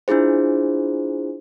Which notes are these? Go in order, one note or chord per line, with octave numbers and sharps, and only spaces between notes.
D4 E4 F4 G#4 C5